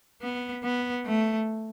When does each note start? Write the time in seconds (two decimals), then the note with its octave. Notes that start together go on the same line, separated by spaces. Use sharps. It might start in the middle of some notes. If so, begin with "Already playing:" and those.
0.22 B3
0.64 B3
1.06 A3